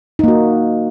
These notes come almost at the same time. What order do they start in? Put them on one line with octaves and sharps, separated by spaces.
D#4 A#3 F#4